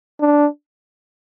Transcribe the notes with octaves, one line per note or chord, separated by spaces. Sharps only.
D4